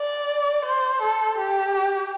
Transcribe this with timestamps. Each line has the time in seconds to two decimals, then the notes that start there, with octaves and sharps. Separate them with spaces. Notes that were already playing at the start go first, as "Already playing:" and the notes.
Already playing: D5
0.65 C5
1.02 A4
1.38 G4